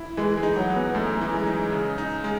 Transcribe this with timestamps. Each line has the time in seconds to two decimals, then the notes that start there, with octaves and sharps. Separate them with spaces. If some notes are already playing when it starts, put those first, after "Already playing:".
Already playing: E4
0.17 E3 G#3
0.37 G#3
0.43 D#4
0.56 F#3
0.70 G#3
0.76 B3
0.95 F#2 A3
1.21 E3
1.34 G#3
1.46 D#4
1.72 C#3
1.98 D#4
2.24 G#3